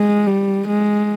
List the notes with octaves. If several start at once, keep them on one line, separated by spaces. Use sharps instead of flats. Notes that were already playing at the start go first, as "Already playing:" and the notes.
Already playing: G#3
G3
G#3